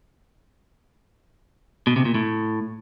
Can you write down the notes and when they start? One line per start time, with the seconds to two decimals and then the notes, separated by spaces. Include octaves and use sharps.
1.87 B2
1.96 C3
2.05 A#2
2.15 A2